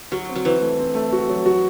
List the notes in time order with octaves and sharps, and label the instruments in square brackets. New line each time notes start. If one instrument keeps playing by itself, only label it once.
[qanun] F#3 [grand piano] F#4
[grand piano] C4
[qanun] F#3
[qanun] E3 [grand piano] C5
[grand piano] A3
C4
A3
F#4
F#3
F#4